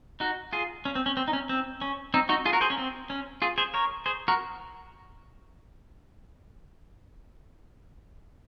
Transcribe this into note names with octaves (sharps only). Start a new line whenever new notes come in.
D#4 F#4
F4 G#4
C#4
C4
C#4
C4
D#4
C#4
C4
C#4
C4 D#4
D#4 F#4
F4 G#4
F#4 A#4
G#4 C5
C#4
C4
C#4
F4 G#4
G#4 C5
A#4 C#5
G#4 C5
F#4 A#4